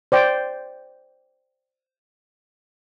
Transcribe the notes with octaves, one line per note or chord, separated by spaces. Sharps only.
C5 D5 G5